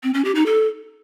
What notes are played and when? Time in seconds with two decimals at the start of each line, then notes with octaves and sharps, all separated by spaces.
0.03 C4
0.14 C#4
0.24 G4
0.35 D#4
0.46 A4